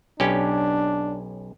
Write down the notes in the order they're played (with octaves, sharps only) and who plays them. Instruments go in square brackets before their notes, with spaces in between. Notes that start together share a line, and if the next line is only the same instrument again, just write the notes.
[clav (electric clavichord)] B1 C#4 G4 [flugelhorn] D4